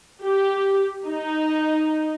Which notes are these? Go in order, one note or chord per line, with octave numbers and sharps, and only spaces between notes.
G4
D#4